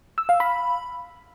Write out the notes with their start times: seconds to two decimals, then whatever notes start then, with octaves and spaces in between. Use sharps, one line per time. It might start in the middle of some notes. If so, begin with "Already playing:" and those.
0.18 E6
0.29 F5
0.40 B5